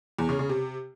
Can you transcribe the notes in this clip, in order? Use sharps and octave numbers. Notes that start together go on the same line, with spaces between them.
E2
C#3
C#3
C3